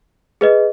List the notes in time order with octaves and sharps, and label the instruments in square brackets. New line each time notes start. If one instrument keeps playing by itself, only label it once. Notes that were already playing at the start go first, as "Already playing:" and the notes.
[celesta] G#4 B4 D#5